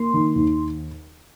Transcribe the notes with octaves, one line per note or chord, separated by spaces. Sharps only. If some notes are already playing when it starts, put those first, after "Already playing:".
Already playing: A#3 C6
D#3
D#2